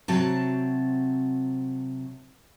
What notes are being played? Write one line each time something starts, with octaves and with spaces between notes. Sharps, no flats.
C3 F#3 C4 F#4 A5